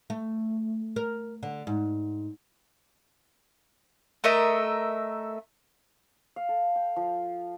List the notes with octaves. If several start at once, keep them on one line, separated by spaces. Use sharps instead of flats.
A3
A#4
D3
G#2
A3 A#4 D#5 E5
F5
A4
G5
F3